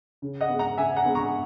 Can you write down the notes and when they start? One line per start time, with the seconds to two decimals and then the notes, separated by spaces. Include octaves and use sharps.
0.22 C#3
0.41 D#5 F#5
0.49 G#3 B3
0.59 F#5 A#5
0.78 C#3 E5 G#5
0.96 F#5 A#5
1.05 G#3 B3
1.15 A#5 C#6